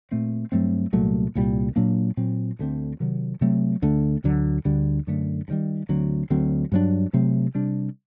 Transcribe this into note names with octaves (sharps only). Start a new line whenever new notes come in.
A#2 A3 C4
G2 F#3 A3 C4
C2 A#2 F#3 A3
C2 A#2 G3
A#2 F#3 A#3 D4
A#2 F#3 C4
D2 D3 A3 C4
C3 D#3 F#3
C3 F#3 A3 C4
D2 D3 A3
D2 D3 F#3
D2 D3 G3
F#2 D3 A3
G2
D#3 G3
D2 D3 F#3 C4
D2 D3 F#3 C4
G2 F#3 A#3 D4
C3 F#3 A3 C4
C3 G3 D4